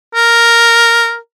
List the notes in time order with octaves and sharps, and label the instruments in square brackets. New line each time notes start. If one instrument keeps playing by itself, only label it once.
[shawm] A#4